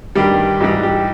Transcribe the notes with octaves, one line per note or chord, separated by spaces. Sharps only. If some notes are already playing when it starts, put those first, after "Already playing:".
G2 D#3 G3 G4
G#2 E3 G3 G4
G4